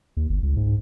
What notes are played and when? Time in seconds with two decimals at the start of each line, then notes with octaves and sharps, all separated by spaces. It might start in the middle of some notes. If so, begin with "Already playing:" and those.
0.17 D#2
0.29 G1
0.43 C#2
0.57 G#2